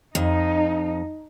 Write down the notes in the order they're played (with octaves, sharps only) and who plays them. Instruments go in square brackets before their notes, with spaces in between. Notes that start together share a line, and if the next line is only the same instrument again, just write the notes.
[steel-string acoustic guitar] F2 [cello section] D#4